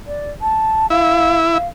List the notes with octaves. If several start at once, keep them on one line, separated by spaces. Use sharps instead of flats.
D5
A5
E4 F5
F5